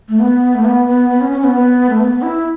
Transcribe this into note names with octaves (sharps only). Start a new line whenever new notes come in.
A3
B3
A3
B3
B3
B3
C#4
C#4
B3
B3
A3
B3
E4